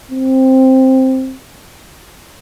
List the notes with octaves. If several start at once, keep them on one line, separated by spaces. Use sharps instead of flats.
C4